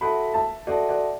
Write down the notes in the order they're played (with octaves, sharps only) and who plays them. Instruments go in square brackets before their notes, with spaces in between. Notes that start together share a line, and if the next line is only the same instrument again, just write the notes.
[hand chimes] F#4 A4 E5 A5 [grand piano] F#5 B5
[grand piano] E5 A5
[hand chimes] F#4 A4 E5 A5 [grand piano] D5 F#5
[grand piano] D5 F#5